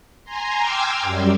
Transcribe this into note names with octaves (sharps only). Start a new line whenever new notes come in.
G#5 A#5 C6
G5 C6 D6 E6 F6 G#6
F#2 G3